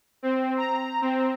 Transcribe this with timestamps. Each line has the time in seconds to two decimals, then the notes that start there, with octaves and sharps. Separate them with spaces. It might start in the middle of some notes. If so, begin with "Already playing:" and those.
0.23 C4
0.58 A#5
1.02 C4